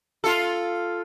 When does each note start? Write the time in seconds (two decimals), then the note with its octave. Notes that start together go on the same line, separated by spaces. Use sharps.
0.24 F4 A4